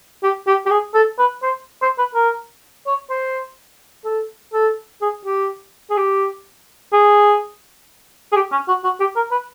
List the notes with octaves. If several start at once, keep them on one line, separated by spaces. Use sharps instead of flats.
G4
G4
G4
G#4
A4
B4
C5
C5
B4
A#4
C#5
C5
A4
A4
G#4
G4
G#4
G4
G#4
G#4
G4
C#4
F#4
F#4
G4
A#4
B4